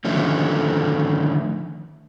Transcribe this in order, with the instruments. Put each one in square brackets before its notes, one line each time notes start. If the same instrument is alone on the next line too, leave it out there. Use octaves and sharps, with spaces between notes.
[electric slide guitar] D3 D#3 F3 A3 C#4